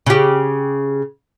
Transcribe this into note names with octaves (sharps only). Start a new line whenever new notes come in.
C#3 G4